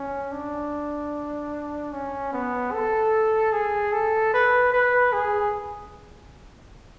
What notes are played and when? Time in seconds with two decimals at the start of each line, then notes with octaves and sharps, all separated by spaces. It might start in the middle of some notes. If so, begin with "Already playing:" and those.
Already playing: C#4
0.32 D4
1.93 C#4
2.33 B3
2.72 A4
3.53 G#4
3.93 A4
4.34 B4
4.73 B4
5.13 G#4